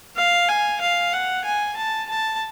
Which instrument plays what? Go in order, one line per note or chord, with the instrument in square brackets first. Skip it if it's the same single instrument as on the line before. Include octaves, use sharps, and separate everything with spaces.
[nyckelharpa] F5
G#5
F5
F#5
G#5
A5
A5